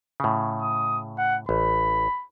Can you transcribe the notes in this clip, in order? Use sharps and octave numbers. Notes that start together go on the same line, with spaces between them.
A2 C#3
D#6
F#5
A1 B5